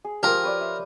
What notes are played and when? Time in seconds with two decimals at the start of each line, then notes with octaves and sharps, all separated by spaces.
0.05 G#4
0.23 F3 F4 G4 A#4
0.43 B4 C#5 D5
0.61 E5